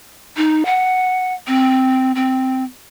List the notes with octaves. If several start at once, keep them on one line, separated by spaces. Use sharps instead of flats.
D#4
F#5
C4
C4